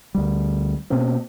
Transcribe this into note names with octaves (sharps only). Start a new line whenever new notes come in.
D2 G3
B2 A#3 C4 C#4